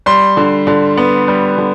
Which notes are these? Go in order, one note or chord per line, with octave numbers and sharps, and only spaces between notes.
G3 C6
D3
D3
B3
G3
D3